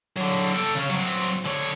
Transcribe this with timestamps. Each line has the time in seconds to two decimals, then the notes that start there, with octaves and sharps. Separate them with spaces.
0.16 D3 F#3
0.53 A4 G5
0.74 C#3 C#4
0.90 F#3 C4
1.45 D3 C#5